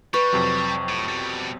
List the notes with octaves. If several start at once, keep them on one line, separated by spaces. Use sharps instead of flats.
G3 B4 C#6
F2 C3 F#3
A2
B2 G3